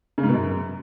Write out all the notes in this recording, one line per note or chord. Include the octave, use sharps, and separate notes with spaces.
C#3
G#2
B2
F#2